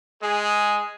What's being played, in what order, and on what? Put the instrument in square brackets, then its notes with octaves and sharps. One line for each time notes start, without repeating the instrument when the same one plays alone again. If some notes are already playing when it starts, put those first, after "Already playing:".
[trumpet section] G#3 G#4